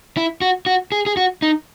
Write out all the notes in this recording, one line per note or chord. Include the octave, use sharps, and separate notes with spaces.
E4
F#4
F#4
G#4
G#4
F#4
D#4